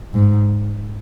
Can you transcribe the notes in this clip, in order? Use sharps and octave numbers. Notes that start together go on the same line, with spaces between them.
G#2